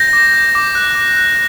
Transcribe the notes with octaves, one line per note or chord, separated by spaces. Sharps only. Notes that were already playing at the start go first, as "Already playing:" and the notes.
Already playing: G6 A#6
D6
G6
D6
F#6
D6
F#6